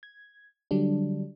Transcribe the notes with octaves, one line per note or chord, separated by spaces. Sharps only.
G#6
D3 F#3 G3 D4